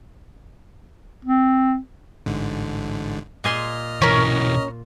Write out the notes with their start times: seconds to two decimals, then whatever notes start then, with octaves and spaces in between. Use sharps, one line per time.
1.25 C4
2.26 A1 G#2 D3
3.44 A#2 D#5 G#5 C6 F6
4.02 B1 E3 C#4 A#4